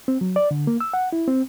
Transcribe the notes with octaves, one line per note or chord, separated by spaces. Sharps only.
C4
F#3
D5
D3
A#3
E6
F#5
E4
C4